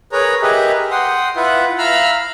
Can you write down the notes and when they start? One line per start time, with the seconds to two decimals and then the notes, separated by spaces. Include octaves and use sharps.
0.12 G#4 A#4 B4 C#5 A#5
0.42 G4 G#4 A#4 B4 D#5 E5
0.91 F#5 G5 C6 D#6
1.36 E4 F4 B4 E5 F#5
1.78 E5 F5 A#5 B5 E6 F6